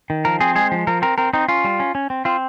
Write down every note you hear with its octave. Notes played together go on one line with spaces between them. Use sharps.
D#3
F3 A#4
C4 G#4
G#3 G#4
F3
F3 A#4
C4 A#4
C4 A#4
C4 D#4
C#4 F4
G3
C#4
C#4
C4
C4 F4